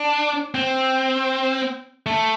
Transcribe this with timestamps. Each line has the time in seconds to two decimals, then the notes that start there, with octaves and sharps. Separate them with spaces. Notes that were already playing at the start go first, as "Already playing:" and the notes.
Already playing: D4
0.55 C4
2.06 A3